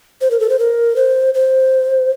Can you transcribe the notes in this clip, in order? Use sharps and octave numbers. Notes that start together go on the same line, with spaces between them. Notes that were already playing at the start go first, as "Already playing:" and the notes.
C5
A#4
A4
C5
A#4
C5
C5